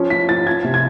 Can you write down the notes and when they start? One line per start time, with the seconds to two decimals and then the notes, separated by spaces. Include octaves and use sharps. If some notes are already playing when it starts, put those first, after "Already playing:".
Already playing: F3 C#4
0.10 F3 B6
0.29 F3 A6
0.47 F3 G#6
0.64 C3
0.74 G#6